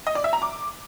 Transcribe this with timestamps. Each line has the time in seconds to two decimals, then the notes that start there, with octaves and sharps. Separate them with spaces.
0.07 D#5
0.15 D5
0.24 E5
0.33 A#5
0.42 D6